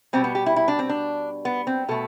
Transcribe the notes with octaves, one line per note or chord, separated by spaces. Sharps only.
B2 G3 C4
B3
G4
E4
E4
D4
C4
D4
B3
C4
B2 A3 A4